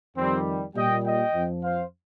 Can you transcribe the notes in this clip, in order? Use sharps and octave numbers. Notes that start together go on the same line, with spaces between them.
F2 D#3 G3 C4
A#2 G3 D#5 G5
D#5 G5
F2 F3
C5 F5